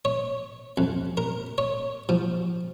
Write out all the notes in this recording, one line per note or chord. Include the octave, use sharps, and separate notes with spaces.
C#5
F2
A#4
C#5
F3